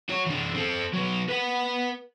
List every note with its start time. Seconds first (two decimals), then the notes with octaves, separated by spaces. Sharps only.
0.09 F#4 C#5
0.26 E3 D4
0.55 C4 A4
0.94 F#3 B3
1.29 B4 F#5